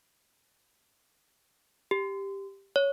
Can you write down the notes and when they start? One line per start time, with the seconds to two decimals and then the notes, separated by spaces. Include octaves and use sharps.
1.91 G4
2.76 C#5